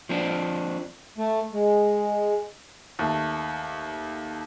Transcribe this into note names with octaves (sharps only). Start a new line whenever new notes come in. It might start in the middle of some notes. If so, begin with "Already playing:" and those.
F3 C4 D4
A3
G#3
D#2 A3